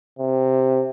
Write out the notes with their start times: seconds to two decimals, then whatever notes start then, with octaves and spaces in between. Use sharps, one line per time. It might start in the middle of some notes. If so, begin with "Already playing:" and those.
0.19 C3